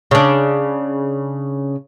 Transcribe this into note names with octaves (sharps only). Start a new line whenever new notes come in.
C#3 D4